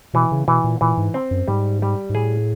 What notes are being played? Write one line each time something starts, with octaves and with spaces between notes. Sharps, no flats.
B2 E3
C#3
B2 E3
A#2
A#2 E3
G#2
C4
F#2
G#2 G3
G3
G#2
A2 G#4